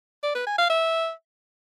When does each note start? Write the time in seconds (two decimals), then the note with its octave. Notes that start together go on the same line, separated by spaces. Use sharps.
0.23 D5
0.35 B4
0.46 G#5
0.58 F5
0.70 E5